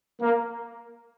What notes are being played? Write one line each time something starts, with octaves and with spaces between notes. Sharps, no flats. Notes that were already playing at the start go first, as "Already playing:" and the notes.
A#3